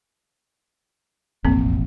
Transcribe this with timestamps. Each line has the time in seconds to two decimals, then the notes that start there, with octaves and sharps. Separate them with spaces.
1.45 E1 A1 F2 A#3 C4